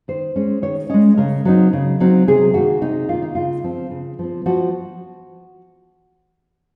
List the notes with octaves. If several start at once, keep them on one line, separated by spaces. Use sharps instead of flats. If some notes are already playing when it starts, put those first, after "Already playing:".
D#3 C5
G#3 C#4
D#3 C#5
G#3 C#4 D#5
C#3 A#4
F#3 C4 D#4
C#3
F#3 C4 D#4
C3 G#4
D#3 A#3 F#4
C3 D#4
D#3 A#3 F4
D#4
C#3 F4
F3 C4
C#3
F3 C4
F3 F#4